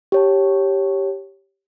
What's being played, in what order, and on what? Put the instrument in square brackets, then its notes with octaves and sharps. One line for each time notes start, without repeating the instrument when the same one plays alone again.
[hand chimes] G4 C#5 A5